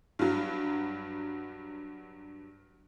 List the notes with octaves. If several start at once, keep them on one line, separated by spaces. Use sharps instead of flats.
G2 F#3